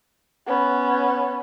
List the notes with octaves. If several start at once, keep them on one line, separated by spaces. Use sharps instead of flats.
B3 C#4